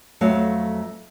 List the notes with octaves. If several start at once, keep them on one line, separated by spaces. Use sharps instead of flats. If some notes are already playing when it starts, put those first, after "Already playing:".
F2 F#3 A3 F#4 F5